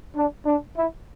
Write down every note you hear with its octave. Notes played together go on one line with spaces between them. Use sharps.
D4
D4
E4